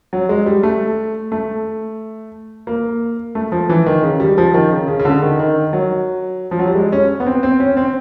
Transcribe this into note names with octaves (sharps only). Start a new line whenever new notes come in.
F#3
G#3
G3
A3
A3
A#3
A3
F3
E3
D#3
C#3
G3
F3
D#3
C#3
C#3
C#3
D3
D#3
D#3
F#3
F3
F#3
G3
G#3
C#4
B3
C4
C4
C#4
C4